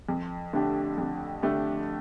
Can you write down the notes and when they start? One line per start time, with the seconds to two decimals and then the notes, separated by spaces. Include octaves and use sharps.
0.09 F2
0.53 D3 A3 D4 G4
0.98 F2
1.42 D3 A3 D4 G4